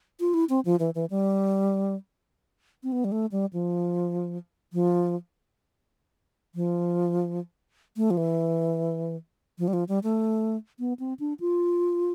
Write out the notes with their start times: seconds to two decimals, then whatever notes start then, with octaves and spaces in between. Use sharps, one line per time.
0.20 F4
0.34 E4
0.49 C4
0.65 F3
0.79 E3
0.95 E3
1.10 G3
2.83 C4
2.92 B3
3.04 G3
3.12 A3
3.32 G3
3.53 F3
4.73 F3
6.55 F3
7.97 A3
8.11 F3
8.17 E3
9.59 F3
9.68 G3
9.73 F3
9.88 G3
10.03 A3
10.79 B3
10.99 C4
11.20 D4
11.40 F4